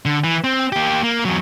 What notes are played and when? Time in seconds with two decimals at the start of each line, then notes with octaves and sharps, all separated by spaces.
0.05 D3
0.24 E3
0.44 C4
0.72 A#3 G4
1.03 A#3
1.25 E2 F#3